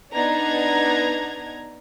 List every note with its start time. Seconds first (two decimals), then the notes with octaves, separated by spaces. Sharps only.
0.13 B3 D4 D#4 A#5 G#6